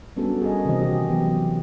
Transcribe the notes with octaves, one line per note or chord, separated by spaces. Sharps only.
G3 B3 C#4 D4 F#4 A4
G#4 A#4 D#5
C3 D#3 E3 C4 F#4 D#5
G4
E3 F#3 B3 G4